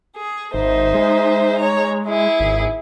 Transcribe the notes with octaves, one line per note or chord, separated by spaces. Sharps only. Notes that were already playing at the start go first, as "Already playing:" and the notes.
G#4
G#1 D#4 C5 E5
G#3
C#5 A#5
E4 G#4
G#1